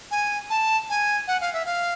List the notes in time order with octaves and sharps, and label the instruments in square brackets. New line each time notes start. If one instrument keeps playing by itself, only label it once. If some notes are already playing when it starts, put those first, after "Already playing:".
[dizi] G#5
A5
G#5
F#5
F5
E5
F5